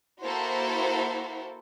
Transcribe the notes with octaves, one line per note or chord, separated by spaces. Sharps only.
A#3 E4 F#4 A4 C5